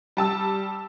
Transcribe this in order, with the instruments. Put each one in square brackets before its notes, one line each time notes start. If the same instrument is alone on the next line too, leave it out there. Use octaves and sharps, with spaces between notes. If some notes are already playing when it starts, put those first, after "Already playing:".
[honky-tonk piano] G3 A5 E6